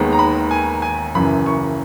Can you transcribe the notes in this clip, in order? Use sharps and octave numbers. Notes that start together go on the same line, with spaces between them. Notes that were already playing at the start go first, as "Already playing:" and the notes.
Already playing: D#2 D#3 G#3 B3
A#5
B5
G#5
G#5
F#1 F#2 E3 B5
C#6